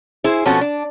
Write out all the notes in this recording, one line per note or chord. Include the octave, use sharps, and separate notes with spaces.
E4 G#4 C5
B2 F3 C4 C#4 F#4 A4
D4